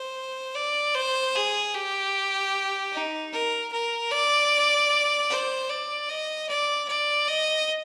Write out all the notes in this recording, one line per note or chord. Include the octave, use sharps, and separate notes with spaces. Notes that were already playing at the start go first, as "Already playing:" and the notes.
Already playing: C5
D5
C5
G#4
G4
D#4
A#4
A#4
D5
C5
D5
D#5
D5
D5
D#5